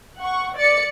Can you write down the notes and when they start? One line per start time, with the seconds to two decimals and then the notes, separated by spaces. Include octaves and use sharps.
0.19 F#5 C#6
0.58 D5 A6 C#7